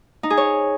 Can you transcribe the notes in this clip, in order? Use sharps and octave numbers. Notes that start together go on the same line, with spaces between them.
D#4
G#4
C#5